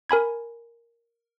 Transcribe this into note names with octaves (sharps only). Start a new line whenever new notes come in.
A#4 G#5 B5 G#6